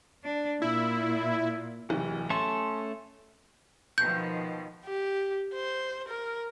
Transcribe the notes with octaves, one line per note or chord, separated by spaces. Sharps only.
D4
A#2 E4
D1 C2 E3
A3 C#4 A4 C6
B2 D#3 F3 G6
G4
C5
A#4